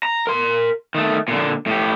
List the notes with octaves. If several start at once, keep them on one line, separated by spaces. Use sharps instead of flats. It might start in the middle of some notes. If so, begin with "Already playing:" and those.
A#5
A#4 C6
D#3 A3
A#2 D3
A2 G4